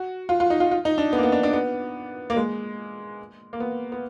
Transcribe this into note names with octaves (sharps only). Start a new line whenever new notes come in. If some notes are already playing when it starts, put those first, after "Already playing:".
Already playing: F#4
F4
F4
D#4
F4
F4
D#4
D4
B3
A#3
B3
D4
D4
B3
A#3
G#3
A#3
B3
B3